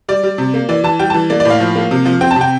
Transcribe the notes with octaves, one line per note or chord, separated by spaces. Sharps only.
G3 D5
G3
C3
A#3
E3 D5
E3 A5
G3 G5
E3 A5
A#3 D5
D5
A2
F5
F3
A#3
C3
F3
C4 G5
A5
C3 G5